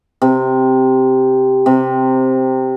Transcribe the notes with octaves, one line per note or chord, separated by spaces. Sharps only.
C3
C3